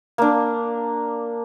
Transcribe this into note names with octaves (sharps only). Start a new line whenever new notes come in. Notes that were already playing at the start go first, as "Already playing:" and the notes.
A#3 D4